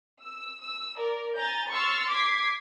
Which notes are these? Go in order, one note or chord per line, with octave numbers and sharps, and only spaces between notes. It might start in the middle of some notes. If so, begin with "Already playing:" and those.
E6
E6
A#4 D5
G#5 A#5 G6 A6
C6 C#6 E6 F6 A6
D6 G#6 B6 C7